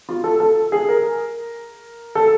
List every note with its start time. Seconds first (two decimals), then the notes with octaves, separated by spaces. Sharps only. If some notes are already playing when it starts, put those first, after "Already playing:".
0.09 F4
0.24 A4
0.40 A4
0.72 G#4
0.89 A#4
2.15 A4